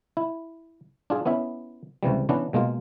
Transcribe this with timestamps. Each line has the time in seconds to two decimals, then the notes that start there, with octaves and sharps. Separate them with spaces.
0.17 E4
1.10 D4 F4 G#4
1.26 B3 C#4 E4 E5
2.03 C#2 C3 E3 G3
2.29 E3 B3 C#4 D4 B4
2.53 B2 G#3 A#3 F4